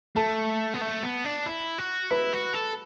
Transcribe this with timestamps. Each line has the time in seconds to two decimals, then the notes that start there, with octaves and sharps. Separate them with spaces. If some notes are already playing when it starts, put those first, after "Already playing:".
0.16 A3 A4 A5
0.74 B3
0.81 A3
1.03 B3
1.24 D4
1.46 E4
1.79 F#4
2.11 E4 B4 B5
2.34 F#4
2.54 A4